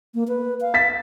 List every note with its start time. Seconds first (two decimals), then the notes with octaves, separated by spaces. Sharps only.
0.14 A#3
0.28 B4
0.61 F5
0.74 A6 B6